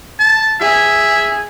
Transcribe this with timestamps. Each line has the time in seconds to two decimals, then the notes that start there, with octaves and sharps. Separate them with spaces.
0.19 A5
0.61 G#4 E5